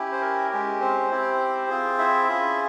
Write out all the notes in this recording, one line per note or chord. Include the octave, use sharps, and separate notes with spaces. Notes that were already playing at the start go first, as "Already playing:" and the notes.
Already playing: C#4 E4 G4
C5
A#4
G#3 C#4 G4
C4 C5
C4 E4 G4
C4 F4 G#4
E4 E5
C#4 F4 G#4